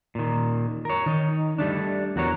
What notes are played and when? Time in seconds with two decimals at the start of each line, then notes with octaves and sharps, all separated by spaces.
0.15 A#2 D#3
0.85 A#4 C#5
1.06 D#3 D#4
1.58 G3 A3 D4
2.16 E2 F#4 A#4 C#5